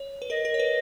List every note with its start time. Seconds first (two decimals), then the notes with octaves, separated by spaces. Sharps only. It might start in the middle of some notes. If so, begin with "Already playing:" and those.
Already playing: C#5
0.22 B4
0.30 A#4 D#5
0.45 A#4
0.54 C#5
0.59 B4